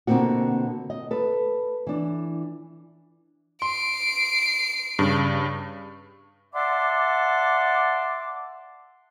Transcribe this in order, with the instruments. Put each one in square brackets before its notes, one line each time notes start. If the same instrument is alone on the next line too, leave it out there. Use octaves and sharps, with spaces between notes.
[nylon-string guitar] B2 D3 A#3 C4 F#4
D#5
A4 B4
E3 D4
[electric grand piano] C6 [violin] C7 D7
[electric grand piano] G2 C#3
[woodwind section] D5 E5 F#5 A5 C6 D6